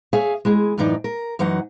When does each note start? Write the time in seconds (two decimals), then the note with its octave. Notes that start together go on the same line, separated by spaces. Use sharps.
0.13 G#4 C#5 E5 F5 G#5
0.45 G#3 E4 G#4
0.78 F#2 A2 E3 D4 D#4
1.04 A#4
1.39 F#2 E3 F#3 D#4 F#5